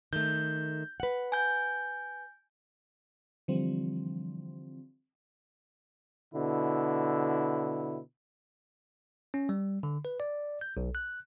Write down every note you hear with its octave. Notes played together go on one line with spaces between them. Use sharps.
D#3 A3 G6
B4 F#5
G#5 G6
D3 E3 F3 G3 C4
B2 D3 E4
C#4
G3
D3
B4
D5
G6
B1
F#6